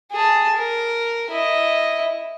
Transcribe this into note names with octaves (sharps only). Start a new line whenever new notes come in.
G#4 A5
A#4
E4 D#5